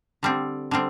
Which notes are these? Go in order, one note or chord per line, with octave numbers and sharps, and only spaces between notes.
D3 G3 C4
D3 G3 C4